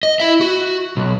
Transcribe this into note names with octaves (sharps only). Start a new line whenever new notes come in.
D#5
E4 E5
F#4
B1